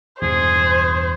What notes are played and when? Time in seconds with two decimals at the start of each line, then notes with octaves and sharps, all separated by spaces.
0.22 E2 G2 B2 G#4 C5